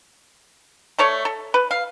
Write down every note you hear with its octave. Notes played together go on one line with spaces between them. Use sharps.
A3 A4 C#5 D5
A4
B4
F5